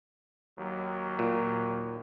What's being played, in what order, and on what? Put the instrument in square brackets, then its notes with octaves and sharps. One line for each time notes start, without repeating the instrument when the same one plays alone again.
[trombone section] D#2 F#3
[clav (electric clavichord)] A#2